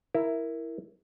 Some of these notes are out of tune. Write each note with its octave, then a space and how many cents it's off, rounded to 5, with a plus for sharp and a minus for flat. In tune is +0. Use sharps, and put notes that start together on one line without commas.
E4 +0 A#4 +0